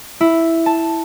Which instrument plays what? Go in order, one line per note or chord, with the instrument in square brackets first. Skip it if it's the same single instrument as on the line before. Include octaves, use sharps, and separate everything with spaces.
[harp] E4
A5